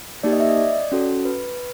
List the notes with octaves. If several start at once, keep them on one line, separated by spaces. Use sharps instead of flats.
A#3 D#4 G4 D5
D#5
E5
D#5
D5
C#4 F#4 A4
B4